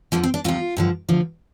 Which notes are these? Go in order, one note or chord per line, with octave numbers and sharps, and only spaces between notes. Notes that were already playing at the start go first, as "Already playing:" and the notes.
F2 D3 F3 A#3
C4
D4
D2 C3 F3 F4
G2 D3 F3
D2 D3 F3